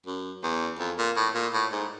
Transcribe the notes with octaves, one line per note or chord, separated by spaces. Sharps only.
F#2
E2
F2
A#2
A2
A#2
A2
G#2